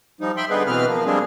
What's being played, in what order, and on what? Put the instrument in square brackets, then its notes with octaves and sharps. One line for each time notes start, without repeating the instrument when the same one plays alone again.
[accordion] F3 G3 D#4
E5 G5 B5 C6
D3 G3 B3 D#4 G#4 B4
B2 E3 C4 B4 F6
F3 A#3
G3 G#3 A#3 C4 D4 G#4